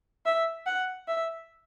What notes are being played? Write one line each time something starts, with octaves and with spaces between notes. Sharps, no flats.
E5
F#5
E5